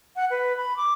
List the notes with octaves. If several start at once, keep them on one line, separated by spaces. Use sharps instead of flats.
F#5
B4
B5
D6